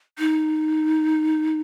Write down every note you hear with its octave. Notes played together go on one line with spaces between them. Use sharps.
D#4